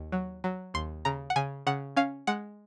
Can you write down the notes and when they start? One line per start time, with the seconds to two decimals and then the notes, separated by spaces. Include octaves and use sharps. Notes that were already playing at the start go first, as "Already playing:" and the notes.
Already playing: D#2
0.12 F#3
0.44 F#3
0.74 D#2 C6
1.05 C#3 A#5
1.30 F#5
1.36 C#3 G#5
1.67 C#3 F#5
1.97 C#4 F5
2.27 G#3 F#5